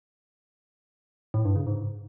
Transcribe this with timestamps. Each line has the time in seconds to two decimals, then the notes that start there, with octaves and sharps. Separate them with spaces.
1.34 A2
1.45 G2
1.56 C#3
1.67 G#2